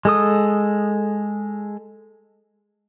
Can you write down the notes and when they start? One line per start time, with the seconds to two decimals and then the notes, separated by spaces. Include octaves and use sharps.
0.05 G#3 A4 D#6